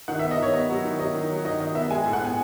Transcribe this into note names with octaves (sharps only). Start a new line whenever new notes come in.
D#3 F#5
E5
B3
D#5
D#3 C#5
B3 D#5
F#3
D#3
F#3 D#5
D#3
F#3
D#3 D#5
D#3 D#5
B3 E5
G#3 G#5
A2
F#5
B3 G#5